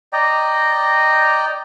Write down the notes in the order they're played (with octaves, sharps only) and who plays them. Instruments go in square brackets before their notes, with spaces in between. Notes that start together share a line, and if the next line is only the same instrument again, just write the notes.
[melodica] D5 D#5 G5 A#5